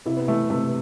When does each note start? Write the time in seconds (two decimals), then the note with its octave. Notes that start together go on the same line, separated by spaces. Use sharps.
0.06 C3 E4
0.17 B3
0.28 E3 A3
0.50 C3 A3